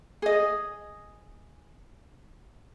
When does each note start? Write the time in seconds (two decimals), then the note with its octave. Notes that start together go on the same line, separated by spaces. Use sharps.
0.22 G#4 D#5